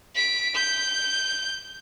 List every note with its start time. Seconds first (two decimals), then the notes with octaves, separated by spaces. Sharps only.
0.15 B6 D7
0.54 G6